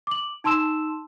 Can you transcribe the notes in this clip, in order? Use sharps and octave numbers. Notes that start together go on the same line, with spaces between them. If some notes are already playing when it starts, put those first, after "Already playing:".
D6 F#7
D#4 A5 C6 E6 E7